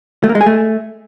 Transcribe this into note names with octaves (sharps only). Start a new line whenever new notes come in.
A3
A#3
G#3
G#4
A3